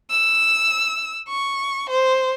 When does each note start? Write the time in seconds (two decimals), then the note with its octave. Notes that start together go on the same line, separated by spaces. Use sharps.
0.10 E6
1.28 C#6
1.90 C5